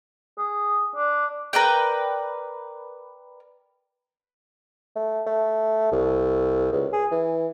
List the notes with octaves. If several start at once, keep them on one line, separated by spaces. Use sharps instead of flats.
G#4
D4
A#4 B4 D5 G5
A3
A3
C2
C#2
G#4
E3